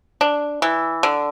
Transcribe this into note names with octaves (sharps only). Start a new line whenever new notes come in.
D4
E3
D3